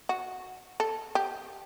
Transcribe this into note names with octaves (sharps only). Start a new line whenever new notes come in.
F#4
A4
G4